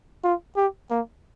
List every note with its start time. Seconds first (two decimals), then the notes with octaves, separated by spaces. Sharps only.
0.24 F4
0.56 G4
0.90 A#3